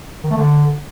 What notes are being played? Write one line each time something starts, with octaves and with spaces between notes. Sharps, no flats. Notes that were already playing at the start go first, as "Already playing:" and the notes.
D#3
A3
D3